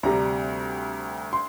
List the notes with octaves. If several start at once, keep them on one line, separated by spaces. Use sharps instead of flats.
D2 C3 G3 A#5
C6